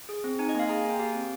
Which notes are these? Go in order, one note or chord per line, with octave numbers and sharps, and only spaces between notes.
G#4
C4
D#4 G#5
D#5
A#3 F5
G#4 A#5
G#5
A#3
G5
G4 F5
C4